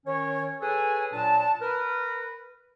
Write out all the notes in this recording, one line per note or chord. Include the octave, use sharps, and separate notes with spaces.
D#3 C#4 C#5
G#4 A4 B4 C#5 G#5
A#2 F#3 D4 A5
A#4 B4